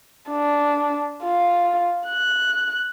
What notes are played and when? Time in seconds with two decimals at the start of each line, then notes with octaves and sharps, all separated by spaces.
0.30 D4
1.23 F4
2.08 F#6